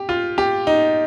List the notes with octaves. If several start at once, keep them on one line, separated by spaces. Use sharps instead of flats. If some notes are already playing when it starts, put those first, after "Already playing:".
Already playing: G4
F4
G4
D#4